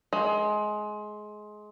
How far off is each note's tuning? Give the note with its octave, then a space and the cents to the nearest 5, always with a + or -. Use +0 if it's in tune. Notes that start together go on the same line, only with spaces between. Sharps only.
G#3 +20